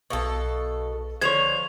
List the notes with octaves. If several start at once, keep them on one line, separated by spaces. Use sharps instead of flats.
B1 B2 A4 F5 C#6
D3 F3 C5 C#5 G#6 F7